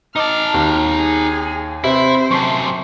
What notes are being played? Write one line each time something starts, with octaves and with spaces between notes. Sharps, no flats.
D#4 D#5 A5 D6 F6
D#2
G#4
C3 E4 B4 C5 E5
F#2 C3 A5 C#6